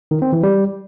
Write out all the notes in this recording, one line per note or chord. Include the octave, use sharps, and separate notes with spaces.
D#3
C4
E3
G3